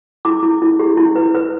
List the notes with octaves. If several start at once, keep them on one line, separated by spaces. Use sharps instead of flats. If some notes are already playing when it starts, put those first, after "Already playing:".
E4 D6
E4
E4
G4
E4
B4
B4